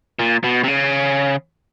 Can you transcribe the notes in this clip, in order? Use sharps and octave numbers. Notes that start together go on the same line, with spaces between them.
A#2
B2
C3
C#3